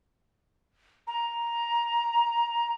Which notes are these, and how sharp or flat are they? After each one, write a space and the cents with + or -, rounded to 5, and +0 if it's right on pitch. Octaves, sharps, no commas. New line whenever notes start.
A#5 +10